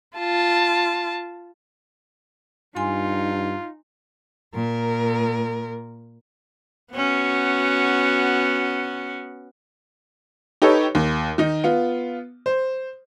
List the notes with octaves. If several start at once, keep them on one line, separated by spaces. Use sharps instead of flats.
F4 A5
G2 D#4 F4 G#5 C6
A#2 A#4
B3 C#4 F#4
D#4 G4 A4 B4 C#5
D#2
D#3 D#4
B3 F4
C5